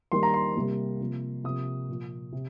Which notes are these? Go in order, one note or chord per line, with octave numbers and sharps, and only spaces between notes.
D#3 G3 A#3 C6
A#5
C6
C3 G3 A#3
C3 F3 A#3
C3 F3 A#3 D#6
A#2 F3 A#3
C3